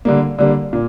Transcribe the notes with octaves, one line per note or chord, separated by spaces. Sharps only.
D3 G3 A#3
D3 G3 A#3
A#2